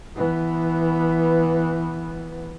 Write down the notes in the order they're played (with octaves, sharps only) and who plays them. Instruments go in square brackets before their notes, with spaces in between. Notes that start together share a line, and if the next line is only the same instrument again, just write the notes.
[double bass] E3 B3